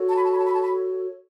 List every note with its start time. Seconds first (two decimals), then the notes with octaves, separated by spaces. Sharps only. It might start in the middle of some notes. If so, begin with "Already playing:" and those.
Already playing: F#4 A4 C#5
0.10 A5
0.16 B5
0.24 A5
0.32 B5
0.38 A5
0.46 B5
0.53 A5
0.60 B5